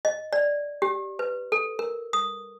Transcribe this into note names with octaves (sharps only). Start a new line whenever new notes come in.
D#5
D5
G4
B4
A4
A#4
D#6